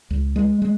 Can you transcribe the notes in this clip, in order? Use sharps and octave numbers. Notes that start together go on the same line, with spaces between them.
C#2
G#3
G#3